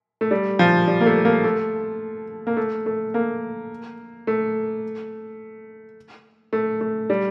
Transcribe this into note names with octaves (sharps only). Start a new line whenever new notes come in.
A3
G3
F3
G3
A#3
A3
A#3
A3
A#3
A3
A3
A#3
A3
A3
A3
G3